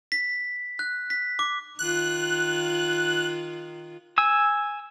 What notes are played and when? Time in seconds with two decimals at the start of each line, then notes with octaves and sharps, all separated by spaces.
0.12 B6
0.79 F#6
1.10 B6
1.39 D6
1.79 D#3 F4 F#6
4.18 G#5 E6